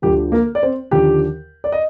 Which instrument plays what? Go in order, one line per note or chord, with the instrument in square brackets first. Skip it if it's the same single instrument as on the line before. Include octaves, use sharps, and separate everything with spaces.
[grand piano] D2 D3 F3 G4
A#3 A#4
D5
C4 C5
D#2 D3 F3 G4 G5
D5
D#5